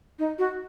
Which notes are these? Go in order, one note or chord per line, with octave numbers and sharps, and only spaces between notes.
D#4
F#4